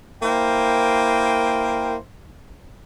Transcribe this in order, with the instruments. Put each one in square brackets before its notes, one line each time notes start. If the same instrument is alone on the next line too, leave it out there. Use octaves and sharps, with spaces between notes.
[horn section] A#3 E4 A#4 C5 G5